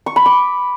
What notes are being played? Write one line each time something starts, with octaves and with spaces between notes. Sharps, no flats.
C#6
B5
D6